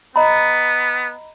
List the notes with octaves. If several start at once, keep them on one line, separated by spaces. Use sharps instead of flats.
B3 D#5 A#5 B5